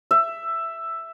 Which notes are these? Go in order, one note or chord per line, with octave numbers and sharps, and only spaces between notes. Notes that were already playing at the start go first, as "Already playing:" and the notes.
E5